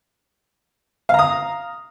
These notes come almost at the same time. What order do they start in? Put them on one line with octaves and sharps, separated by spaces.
F5 A#5 D#6